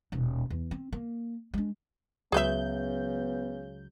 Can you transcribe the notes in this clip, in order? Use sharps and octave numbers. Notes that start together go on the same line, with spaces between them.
D#1 B2
E2
C4
A#3
G#3 D4
C#2 C#3 F#3 B3 G#4 B4 E5 G6